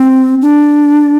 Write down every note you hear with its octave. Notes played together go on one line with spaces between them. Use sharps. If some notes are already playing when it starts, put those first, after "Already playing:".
Already playing: C4
D4